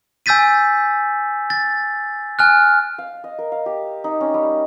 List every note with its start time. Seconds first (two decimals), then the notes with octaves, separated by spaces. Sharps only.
0.26 G#5 E6 G6 A6 B6 D#7
1.50 A6
2.39 G#5 F6 F#6
2.98 F5
3.24 D#5
3.39 A#4
3.52 F5
3.66 G4
4.04 D#4
4.21 C#4
4.34 G3